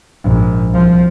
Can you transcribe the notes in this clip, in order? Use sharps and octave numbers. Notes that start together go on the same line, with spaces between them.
A#1 G#2
C2 F3